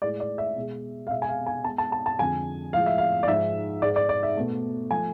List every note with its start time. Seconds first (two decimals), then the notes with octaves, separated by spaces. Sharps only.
0.02 A2 G#3 D5
0.20 D5
0.38 E5
0.57 B2 G#3
1.07 F5
1.10 B2 E5
1.14 G#3
1.22 G#5
1.29 F5
1.47 G#5
1.64 B2 G#3 A5
1.78 A5
1.92 A5
2.06 A5
2.19 F2 D3 F3 G#3 G#5
2.73 A2 F3 G#3 F5
2.86 E5
2.98 F5
3.23 D5
3.28 G#2 F3 G#3 E5
3.82 G#2 G#3 D5
3.96 D5
4.09 D5
4.23 E5
4.37 B2 A3
4.91 F3 A3 G#5